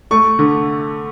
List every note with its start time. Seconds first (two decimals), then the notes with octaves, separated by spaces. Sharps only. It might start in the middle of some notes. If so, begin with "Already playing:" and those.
0.11 A3 C#6
0.39 D3